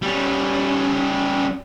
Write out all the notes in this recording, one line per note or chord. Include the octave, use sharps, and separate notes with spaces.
G3 C#4